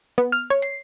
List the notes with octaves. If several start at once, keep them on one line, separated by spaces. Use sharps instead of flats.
B3
F6
C#5
C7